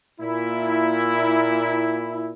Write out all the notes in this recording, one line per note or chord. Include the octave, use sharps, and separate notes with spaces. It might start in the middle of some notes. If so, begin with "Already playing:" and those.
A#2 E4